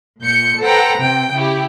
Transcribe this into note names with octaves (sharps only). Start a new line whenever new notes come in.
A#2 G6 C#7
A4 B4 C5 F#5 G5 A#5
C3 G5
C#3 E4 G4